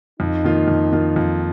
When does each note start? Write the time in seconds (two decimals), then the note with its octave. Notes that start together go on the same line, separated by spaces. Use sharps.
0.20 F2 D#4
0.44 D#3 A#3 F4
0.68 F2
0.92 D#3 A#3 F4
1.16 F2